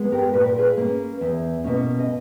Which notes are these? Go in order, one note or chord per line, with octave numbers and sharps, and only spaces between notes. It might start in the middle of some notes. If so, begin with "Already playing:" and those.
Already playing: G#3 B3
G4 A#4
A#2 B4
A#4
G#4 B4
A#3 C#4
E2
B2 A#3 C#4
D#5